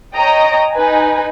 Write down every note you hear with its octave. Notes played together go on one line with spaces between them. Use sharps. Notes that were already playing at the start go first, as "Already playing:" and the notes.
C#5 D#5 G5 A#5
D#4 B4 G#5